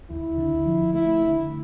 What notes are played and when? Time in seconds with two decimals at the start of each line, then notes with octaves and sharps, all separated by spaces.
0.10 D2 E4
0.38 D3
0.66 F3
0.93 A3 E4
1.21 D3